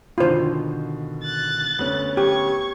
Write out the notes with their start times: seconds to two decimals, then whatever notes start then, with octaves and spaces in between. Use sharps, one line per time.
0.18 B2 D3 D#3 F4 C5
1.23 F#6 A6
1.79 D2 B3 C#4
2.17 G4 C#6 G#6